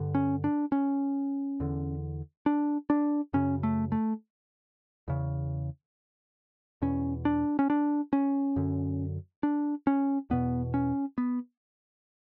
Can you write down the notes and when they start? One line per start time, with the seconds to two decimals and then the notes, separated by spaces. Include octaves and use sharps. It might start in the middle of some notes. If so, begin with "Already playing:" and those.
Already playing: G2 D3
0.15 C#4
0.44 D4
0.72 C#4
1.60 E2 D3
2.46 D4
2.90 D4
3.33 F#2 C#3 C#4
3.63 A3
3.92 A3
5.08 E2 C#3
6.82 E2 B2 C#4
7.25 D4
7.59 C#4
7.70 D4
8.13 C#4
8.56 F#2 D3
9.43 D4
9.87 C#4
10.30 E2 B2 B3
10.74 C#4
11.18 B3